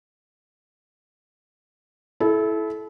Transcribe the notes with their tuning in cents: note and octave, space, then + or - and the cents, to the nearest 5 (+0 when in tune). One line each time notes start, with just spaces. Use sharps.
E4 +0 A4 -30